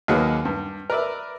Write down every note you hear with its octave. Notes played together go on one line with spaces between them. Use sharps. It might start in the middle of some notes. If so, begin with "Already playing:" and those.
D#2 F#3 A#3 G#4 B4 F#5
G2
A#4 B4 D5 E5